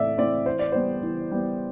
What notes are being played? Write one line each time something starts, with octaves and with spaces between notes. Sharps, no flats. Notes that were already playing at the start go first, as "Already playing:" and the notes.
Already playing: A2 E3 A3 C4 D5 E5
E3 A3 C4 D5
E3 C5
D5
G3 B3 C5
E3
G3 B3